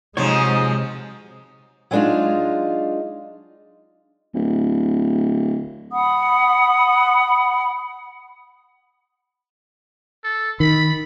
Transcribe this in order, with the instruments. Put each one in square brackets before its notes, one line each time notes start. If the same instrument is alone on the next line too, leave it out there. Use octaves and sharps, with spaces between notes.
[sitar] G#2 F3 F#3 [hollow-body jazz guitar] C3 C#5 [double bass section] G#3 [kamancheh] D#4 D#6
[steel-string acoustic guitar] F#3 G#3 B3 D4 D#4 F4
[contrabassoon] D1
[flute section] F#5 B5 D#6
[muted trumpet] A4
[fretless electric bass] D#3 [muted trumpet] B5